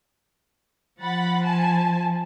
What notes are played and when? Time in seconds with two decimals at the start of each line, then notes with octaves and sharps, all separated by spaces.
1.00 F3 F#5 B5 A6
1.44 G#5 A5